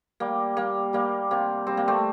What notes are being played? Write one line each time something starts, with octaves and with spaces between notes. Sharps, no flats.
G3 A#3
G3 A#3
G3 A#3
C3 A#3
G3 C4
A#3
A3 C4